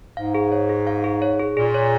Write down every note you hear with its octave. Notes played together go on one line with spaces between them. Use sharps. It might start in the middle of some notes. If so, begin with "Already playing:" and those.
G#2 F5
G#4
C#5
G#4
F5
G#4
C#5
G#4
A#2 G#4
C#5